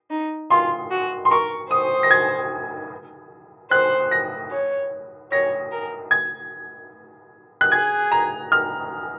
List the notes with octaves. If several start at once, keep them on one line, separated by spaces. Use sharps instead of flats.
D#4
F4 C6
F#4
C6
A#4 C#6
C5 D#6
A#6
G#6
C5 F#6
A#6
C#5
C#5 A#6
A#4
G#6
F#6
G#4 G#6
A#5
F6